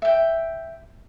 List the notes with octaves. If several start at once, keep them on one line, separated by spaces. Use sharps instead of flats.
E5 G5